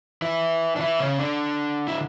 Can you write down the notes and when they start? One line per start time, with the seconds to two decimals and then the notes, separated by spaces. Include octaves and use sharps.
0.22 E3 E4
0.76 D4
0.80 E3 E4
1.00 C#3 C#4
1.19 D3 D4
1.88 E4